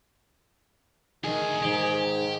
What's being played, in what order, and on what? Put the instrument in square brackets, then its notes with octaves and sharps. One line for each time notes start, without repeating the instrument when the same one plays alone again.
[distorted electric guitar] D2 [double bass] D#3 [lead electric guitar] G#4
[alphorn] G#2 [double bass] D#3 [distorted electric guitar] G4